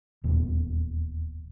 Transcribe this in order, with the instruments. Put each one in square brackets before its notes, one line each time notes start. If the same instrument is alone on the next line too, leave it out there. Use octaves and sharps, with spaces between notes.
[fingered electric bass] D#1 E2 A#2